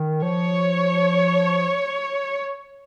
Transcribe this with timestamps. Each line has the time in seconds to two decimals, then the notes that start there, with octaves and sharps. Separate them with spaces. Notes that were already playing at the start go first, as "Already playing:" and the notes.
Already playing: D#3
0.22 F3 C#5